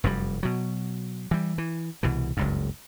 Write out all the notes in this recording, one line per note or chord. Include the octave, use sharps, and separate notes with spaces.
F1 F#2 C3 G3
B2 F#3
E3 G3
E3
C2 B2 E3
F#1 C#2 G2